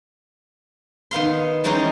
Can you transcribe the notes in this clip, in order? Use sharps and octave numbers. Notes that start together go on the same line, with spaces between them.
D#3 B3 F5 C6
E3 G3 G#3 C#4 D#4 G4